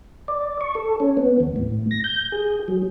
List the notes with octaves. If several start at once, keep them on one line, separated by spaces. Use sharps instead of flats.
D5
C#6
A4
C#4
B3
D#2
A2
A#6
G6
G#4
F#3